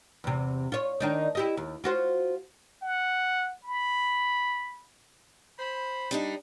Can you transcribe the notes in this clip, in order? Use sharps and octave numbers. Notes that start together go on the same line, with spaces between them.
E2 C3
F4 C#5
D#3 D4 D#4
E4 G4 D#5
D#2
F4 F#4 C5
F#5
B5
C5 B5
G3 D4 D#4